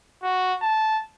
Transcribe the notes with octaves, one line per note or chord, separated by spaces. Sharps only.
F#4
A5